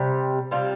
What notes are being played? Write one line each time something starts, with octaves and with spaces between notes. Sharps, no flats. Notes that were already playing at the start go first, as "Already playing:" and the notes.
Already playing: C3 G3
C3 G3 C4 F4